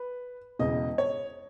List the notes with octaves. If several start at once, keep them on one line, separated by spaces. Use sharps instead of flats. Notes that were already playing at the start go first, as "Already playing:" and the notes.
Already playing: B4
E1 E2 C#3 E3 D#5
C#5